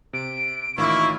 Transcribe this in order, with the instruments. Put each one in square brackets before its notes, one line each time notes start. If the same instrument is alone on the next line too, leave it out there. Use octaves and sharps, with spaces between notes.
[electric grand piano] C3 [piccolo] D7
[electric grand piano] A1 D#3 F4 [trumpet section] A#3 E4 [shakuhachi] C#6